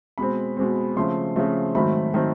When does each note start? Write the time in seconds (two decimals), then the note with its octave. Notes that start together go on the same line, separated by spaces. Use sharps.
0.18 B2 G#3 C4 B5
0.57 B2 G#3 C4
0.97 C#3 F3 A3 C4 C6
1.36 C#3 F3 A3 C4
1.75 G#2 D#3 F#3 A3 C4 B5
2.14 D#3 F#3 A3 C4